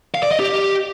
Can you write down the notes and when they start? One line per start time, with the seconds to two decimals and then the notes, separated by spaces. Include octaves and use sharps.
0.15 F5
0.23 D5
0.31 D#5
0.40 G4